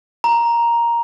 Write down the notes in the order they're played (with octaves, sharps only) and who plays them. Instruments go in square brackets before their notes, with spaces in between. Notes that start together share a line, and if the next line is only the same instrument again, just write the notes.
[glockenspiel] A#5